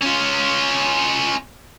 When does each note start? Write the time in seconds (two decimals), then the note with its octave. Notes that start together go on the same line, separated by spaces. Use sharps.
0.01 C#4 F4